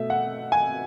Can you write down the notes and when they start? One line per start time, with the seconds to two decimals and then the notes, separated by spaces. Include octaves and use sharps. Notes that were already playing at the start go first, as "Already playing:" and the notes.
Already playing: B2 A3 E5
0.10 F#5
0.52 G#5